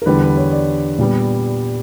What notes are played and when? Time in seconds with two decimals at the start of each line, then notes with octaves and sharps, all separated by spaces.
0.02 A#4
0.06 E2 D3 G3 B4
0.22 B4
0.37 C#5
0.52 D5
0.99 A#2 G3 B3